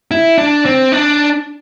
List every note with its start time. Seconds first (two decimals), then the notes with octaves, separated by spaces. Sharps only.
0.11 E4
0.38 D4
0.65 C4
0.92 D4